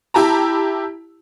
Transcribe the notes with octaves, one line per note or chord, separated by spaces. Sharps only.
E4 G4 A5 A#5